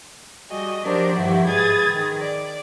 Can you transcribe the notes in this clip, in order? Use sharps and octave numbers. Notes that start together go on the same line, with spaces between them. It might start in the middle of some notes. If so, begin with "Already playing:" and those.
G3 F#4 G#4 D#5
F3 F#3 D4 G4 A#4 C5
G2 D#3 F3 E4 F#4 G4
G#2 G#4 B4 D#6 G#6 A6
D#3 G#4
D5